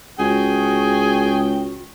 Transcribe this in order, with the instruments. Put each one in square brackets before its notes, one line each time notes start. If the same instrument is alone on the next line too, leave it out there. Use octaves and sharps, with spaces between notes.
[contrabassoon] C#2 [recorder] F#4 [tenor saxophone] G#4 [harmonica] G5